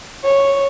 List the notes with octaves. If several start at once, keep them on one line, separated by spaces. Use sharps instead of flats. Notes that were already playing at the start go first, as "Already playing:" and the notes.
C#5